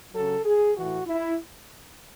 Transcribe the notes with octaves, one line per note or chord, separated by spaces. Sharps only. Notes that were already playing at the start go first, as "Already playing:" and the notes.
C#3 F#3 A4
G#4
A2 E3 F#4
E4